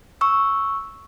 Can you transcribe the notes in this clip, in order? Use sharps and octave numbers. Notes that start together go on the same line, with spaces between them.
C#6 E6